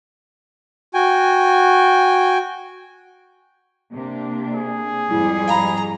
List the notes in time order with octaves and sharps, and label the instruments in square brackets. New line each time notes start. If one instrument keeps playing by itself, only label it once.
[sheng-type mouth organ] F#4 G5 G#5
[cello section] C3 A#3 D4
[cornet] G#4
[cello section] F2 G#2 G3 [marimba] E4
[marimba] F5 B5 [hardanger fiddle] A#5